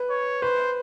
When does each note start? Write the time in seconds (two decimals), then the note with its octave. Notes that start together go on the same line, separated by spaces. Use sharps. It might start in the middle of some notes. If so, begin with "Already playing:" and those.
Already playing: B4
0.10 C#5
0.42 B4 C5